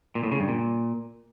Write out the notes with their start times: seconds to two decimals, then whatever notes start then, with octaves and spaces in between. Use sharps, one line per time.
0.15 A#2
0.24 A2
0.32 C#3
0.40 G2
0.48 A#2